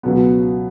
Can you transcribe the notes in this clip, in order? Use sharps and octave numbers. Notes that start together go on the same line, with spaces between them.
C#2 B2 F#3 B3